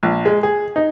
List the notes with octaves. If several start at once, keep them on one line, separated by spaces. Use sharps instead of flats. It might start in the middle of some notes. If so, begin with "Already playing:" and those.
A#1
G#3
G#4
D#4